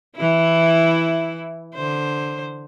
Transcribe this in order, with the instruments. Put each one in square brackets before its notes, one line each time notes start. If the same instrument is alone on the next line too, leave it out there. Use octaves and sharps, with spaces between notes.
[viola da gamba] E3 E4
D3 C5